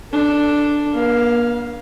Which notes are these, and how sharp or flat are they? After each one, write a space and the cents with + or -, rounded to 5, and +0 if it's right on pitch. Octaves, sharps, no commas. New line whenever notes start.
D4 +0 A4 +0
A#3 +40 F5 +0